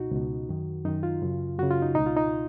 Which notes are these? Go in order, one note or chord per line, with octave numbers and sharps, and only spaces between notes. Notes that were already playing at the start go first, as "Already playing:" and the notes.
Already playing: C#2 B2 D#4 F#4
C#2 B2
F#2 D#3
F#2 D#3 D#4
F4
F#2 C#3
F#2 C#3 F#4
F4
D#4
C#2 B2 D#4
F4
D#4